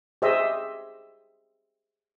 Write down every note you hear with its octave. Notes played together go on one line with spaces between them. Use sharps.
G4 G#4 C5 D#5 E5